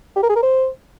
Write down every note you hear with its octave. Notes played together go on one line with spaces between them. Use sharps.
G4
A#4
G#4
A#4
C5